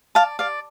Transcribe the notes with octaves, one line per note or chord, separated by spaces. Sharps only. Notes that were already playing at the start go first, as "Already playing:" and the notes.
D5 F5 A5
D5 F5